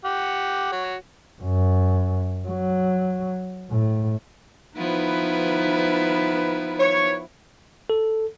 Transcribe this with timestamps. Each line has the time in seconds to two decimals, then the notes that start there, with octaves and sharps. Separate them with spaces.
0.05 G4 F#5
0.72 F#4 C#5
1.42 F#2
2.48 F#3
3.71 A2
4.77 F3 B3 D#4 E4 B4
6.80 C#5
7.90 A4